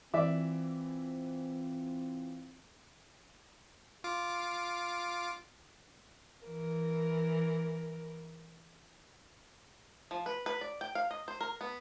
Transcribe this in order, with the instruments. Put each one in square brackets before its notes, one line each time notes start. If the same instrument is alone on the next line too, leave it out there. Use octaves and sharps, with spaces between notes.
[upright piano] E3 [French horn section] C4 F4 [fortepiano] D5 E5 D6
[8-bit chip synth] F4 D6
[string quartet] E3 A#4
[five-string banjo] F3
B4
B4
D5
G5
F5
D#5
C5
A#4
B3